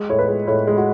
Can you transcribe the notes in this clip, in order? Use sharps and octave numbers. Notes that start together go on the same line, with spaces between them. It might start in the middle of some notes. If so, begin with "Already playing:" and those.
Already playing: G#3
A2 C#5
B4
G#3
A2 C#5
G#3
F#4